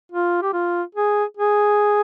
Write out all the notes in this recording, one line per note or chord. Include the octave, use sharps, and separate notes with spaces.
F4
G4
F4
G#4
G#4